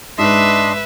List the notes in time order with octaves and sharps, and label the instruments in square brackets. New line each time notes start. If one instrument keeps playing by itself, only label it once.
[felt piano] G#2 [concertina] D4 D#5 C6 [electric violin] B4 E5